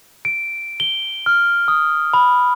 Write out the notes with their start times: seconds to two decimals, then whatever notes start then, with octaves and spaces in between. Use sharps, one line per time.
0.25 D7
0.80 G7
1.26 F6
1.68 D#6
2.14 B5